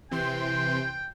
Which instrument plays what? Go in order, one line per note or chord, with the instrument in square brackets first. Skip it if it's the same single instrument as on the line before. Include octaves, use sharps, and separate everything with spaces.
[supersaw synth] C3 E3 C6 [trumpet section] G5